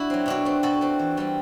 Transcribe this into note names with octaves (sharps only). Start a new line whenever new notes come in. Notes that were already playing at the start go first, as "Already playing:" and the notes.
Already playing: D4 E4 F#4
F#3 C4
B2 D4 F#4
A3 C4
B2 F#4 A4
A3 C4
E3
G3 C4